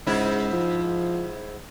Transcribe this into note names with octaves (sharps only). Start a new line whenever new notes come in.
C#2 G#2 E4
F3